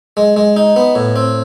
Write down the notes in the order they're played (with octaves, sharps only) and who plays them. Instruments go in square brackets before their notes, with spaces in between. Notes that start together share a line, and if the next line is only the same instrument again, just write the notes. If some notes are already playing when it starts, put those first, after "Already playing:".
[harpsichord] G#3
G#3
D#4
B3
A2
C4